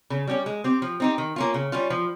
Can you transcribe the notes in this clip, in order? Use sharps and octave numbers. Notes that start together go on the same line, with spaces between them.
C#3
G3 C#4 G4
G#3
C4 G4
F3
C4 D#4 G4
D#3
A#3 C#4 F4
C#3
G3 C#4 F4
F3